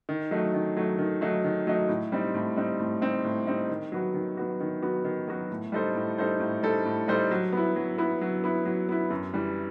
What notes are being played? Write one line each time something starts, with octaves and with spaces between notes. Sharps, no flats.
D#3
F#3 A3 D#4
D#3
F#3 A3 D#4
D#3
F#3 A3 D#4
D#3
F#3 A3 D#4
A2
G3 C4 D#4
A2
G3 C4 D#4
A2
G3 C4 D#4
A2
G3 C4 D#4
D#3
F#3 B3 F#4
D#3
F#3 B3 F#4
D#3
F#3 B3 F#4
D#3
F#3 B3 F#4
A2
G3 D#4 A4 C5
A2
G3 D#4 A4 C5
A2
G3 D#4 A4 C5
A2
G3 D#4 A4 C5
F#3
B3 E4
F#3
B3 E4
F#3
B3 E4
F#3
B3 E4
F#2
E3 G3